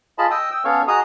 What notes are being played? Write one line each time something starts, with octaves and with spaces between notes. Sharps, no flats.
F4 G#4 D#5 A5 B5
D#5 G5 D#6 E6
G5 E6
B3 C#4 A4 C#5 F5 C#6
F#4 G#4 D#5 A#5 D#6